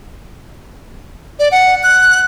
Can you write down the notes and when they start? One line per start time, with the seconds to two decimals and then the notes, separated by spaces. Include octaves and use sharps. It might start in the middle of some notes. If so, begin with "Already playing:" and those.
1.40 D5
1.52 F#5
1.83 F#6